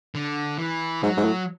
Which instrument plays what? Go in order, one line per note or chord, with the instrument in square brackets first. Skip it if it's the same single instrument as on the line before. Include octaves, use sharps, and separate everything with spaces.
[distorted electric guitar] D3
E3
[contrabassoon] G#2 [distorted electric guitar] F#3
[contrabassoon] G#2
A2